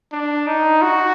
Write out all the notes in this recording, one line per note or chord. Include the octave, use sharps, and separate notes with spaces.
D4
D#4
F#4